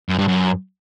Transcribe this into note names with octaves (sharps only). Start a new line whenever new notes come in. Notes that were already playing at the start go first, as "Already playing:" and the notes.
F#2
G2
F#2